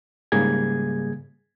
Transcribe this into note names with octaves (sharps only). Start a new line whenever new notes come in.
G#2 C#3 G3 A#3 G#4 G#6